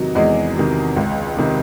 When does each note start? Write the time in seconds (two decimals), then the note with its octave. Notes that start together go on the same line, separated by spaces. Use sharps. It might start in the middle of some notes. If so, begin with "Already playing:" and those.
Already playing: E2 C3 D#3 F#3 G#3
0.15 E2 G#3
0.57 C3 D#3
0.96 C#2
1.37 C3 D#3